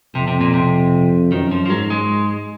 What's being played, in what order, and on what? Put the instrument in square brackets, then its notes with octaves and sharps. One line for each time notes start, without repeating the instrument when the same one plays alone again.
[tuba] F2 [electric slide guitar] C3
[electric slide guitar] C3
A#2
C3
[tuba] F#2 [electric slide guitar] D#3
[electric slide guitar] F3
F3
[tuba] G#2 [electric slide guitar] F#3
[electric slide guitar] G#3